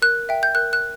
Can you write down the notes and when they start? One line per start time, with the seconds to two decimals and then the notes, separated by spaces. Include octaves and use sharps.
0.02 A#4 F#6
0.29 E5 G5
0.43 G6
0.55 A#4 F#6
0.73 F#6